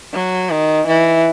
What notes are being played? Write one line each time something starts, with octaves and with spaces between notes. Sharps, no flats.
F#3
D#3
E3